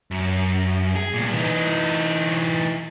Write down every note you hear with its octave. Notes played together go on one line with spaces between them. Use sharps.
F#2
G#4
C2 A#2
E3 D#4